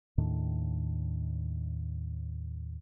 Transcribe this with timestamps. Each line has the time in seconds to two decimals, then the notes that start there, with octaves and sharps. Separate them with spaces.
0.18 D#2 A2 D#3 D4